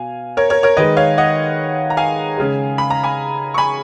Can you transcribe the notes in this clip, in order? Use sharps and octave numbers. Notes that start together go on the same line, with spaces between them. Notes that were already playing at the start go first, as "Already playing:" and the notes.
Already playing: B2 F5 G#5
A#4 C#5
A#4 C#5
A#4 C#5
D#3 G#3 B4 D#5
C#5 F5
D#5 F#5
A#5
F5 G#5
C#3 G#3
B5
A#5
G#5 B5
C#6
G#5 B5